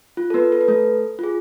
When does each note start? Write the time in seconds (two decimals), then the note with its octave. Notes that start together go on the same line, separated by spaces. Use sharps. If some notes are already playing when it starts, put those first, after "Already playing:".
0.17 F4
0.30 A4
0.34 B3 B4
0.52 A4
0.61 B4
0.68 A3 A4
1.19 F4
1.23 G#4